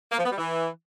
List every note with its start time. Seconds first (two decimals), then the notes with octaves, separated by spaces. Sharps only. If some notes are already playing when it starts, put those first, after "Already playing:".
0.12 A#3
0.19 F3
0.25 B3
0.32 G3
0.38 E3